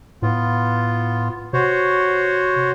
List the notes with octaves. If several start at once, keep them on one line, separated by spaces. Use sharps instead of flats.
A2 B3 F4
C3 F#4 C5 C#5